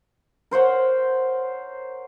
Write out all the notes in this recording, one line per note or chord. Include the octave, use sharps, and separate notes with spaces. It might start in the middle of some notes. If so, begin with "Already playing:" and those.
A#4 C5 C#5 F#5